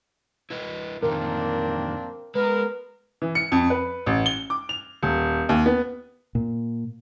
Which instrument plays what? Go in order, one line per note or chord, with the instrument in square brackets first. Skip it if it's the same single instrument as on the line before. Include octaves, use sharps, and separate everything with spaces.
[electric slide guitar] E4 B4 D#5
[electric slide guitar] F2 A#2 D#3 [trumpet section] A#3 C4 D4 [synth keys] A#4
[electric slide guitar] G#3 [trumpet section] B3 A#4 [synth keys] B4
[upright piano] E3
C#7
F2
B4
A1
G7
D6
F7
D#1
D#2
B3
[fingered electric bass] A#2